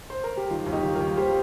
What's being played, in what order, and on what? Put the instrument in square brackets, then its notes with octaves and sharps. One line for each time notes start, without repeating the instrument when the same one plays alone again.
[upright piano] C5
A#4
G4
D#3 F4
D#2
D#4 G4
D#3
F4 A#4
D#2
G3 G4 C5